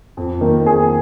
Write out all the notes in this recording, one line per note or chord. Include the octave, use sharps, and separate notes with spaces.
F2
D#3 A#3 D#4
F2 G#4